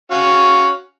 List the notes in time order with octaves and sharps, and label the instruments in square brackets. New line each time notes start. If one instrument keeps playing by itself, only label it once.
[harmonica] C#4 F#4 F5